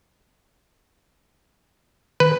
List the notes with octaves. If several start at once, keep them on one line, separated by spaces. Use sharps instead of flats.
D#3 B4